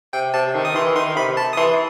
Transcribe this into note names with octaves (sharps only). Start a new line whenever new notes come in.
C3 G5
C3 A5
D#3
D#6
E3 C6
D#3 C6
C3 B5
A5
D#6
E3 C6